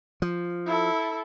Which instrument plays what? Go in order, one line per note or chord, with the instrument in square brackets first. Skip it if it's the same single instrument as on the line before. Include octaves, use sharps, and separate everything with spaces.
[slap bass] F3
[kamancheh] E4 A4